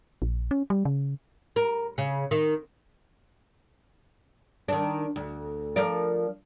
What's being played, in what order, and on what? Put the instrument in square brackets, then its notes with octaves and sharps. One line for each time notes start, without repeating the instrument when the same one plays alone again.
[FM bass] A#1
C#4
G3
C#3
[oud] A#4
C#3
D#3
D#3 D4
D2
F3 A#4 D5